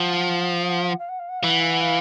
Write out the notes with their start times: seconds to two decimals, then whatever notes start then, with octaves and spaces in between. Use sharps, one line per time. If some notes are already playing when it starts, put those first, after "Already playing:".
Already playing: F3 F#5
0.58 F5
0.67 F#5
0.78 F5
0.88 F#5
0.98 F5
1.09 F#5
1.19 F5
1.29 F#5
1.40 E3 F5
1.49 F#5
1.60 F5
1.70 F#5
1.81 F5